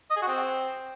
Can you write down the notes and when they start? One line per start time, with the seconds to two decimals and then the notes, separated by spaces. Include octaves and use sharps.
0.10 D#5
0.16 G#4
0.22 F#4
0.28 C4